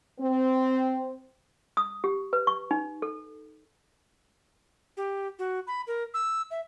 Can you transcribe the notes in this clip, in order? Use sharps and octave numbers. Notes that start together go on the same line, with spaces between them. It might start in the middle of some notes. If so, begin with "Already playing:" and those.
C4
D#6
G4
B4
C#6
D#4
A4
G4
F#4
B5
A#4
E6
E5